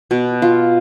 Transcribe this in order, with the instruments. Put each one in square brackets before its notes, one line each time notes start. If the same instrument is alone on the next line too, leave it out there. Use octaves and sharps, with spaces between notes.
[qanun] B2
F4